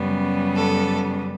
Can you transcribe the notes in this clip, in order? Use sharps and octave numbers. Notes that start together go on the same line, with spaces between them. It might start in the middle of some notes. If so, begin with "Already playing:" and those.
Already playing: F#2 C#3 G3 B3
A4